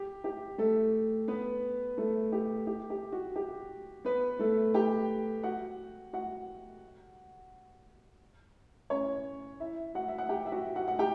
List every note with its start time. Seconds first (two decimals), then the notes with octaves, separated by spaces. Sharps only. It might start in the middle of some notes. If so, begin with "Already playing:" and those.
Already playing: G4
0.24 G4
0.58 A3 A4
1.28 B3 B4
1.98 A3 A4
2.32 G4
2.67 G4
2.90 G4
3.12 F#4
3.36 G4
4.05 B3 B4
4.39 A3 A4
4.74 G4 G5
5.43 F#4 F#5
6.13 F#4 F#5
8.90 C#4 C#5
9.60 E4 E5
9.95 F#4 F#5
10.08 E5
10.18 F#5
10.29 G4 G5
10.46 E5
10.52 F#4 F#5
10.76 F#4 F#5
10.88 F#5
10.99 G4 G5